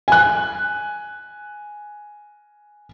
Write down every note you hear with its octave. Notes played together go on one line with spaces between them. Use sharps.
G#5 F#6